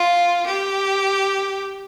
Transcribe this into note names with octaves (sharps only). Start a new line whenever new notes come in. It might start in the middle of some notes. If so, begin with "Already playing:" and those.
Already playing: F4
G4